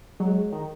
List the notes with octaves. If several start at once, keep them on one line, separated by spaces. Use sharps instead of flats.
F#3 G#3
D#3